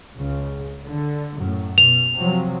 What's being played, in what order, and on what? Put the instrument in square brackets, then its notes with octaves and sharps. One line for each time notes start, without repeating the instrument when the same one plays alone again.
[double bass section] C#2 C#3
D3
F#2 A2
[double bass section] B2 [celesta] F7
[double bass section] C3 F3 F#3